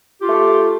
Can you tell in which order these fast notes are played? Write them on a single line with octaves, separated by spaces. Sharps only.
G4 F4 A3